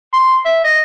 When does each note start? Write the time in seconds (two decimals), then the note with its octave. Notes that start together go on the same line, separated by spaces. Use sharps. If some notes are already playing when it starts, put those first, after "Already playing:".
0.13 C6
0.45 E5
0.64 D#5